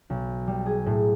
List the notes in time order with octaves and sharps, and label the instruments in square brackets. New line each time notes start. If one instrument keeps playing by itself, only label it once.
[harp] B1
G3
G#4
A2